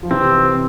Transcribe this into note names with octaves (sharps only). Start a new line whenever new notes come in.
F3
C3 E3 C4